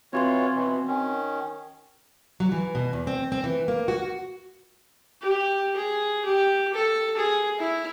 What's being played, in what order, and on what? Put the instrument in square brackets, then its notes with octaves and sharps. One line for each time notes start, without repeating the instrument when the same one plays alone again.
[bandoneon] E3 F4 C#5 [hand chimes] C4 F#4 C6
[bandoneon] B2 E3
D#3 C#4
[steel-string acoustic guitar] F#3
E3
B2
E2
C4
C4
E3
A#3
F#4
[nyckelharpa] G4
G#4
G4
A4
G#4
E4